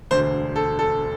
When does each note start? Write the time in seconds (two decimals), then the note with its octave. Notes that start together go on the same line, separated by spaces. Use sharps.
0.11 E1 D2 D3 C5
0.56 A4
0.79 A4